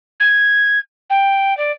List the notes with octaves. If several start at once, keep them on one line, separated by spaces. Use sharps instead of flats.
G#6
G5
D5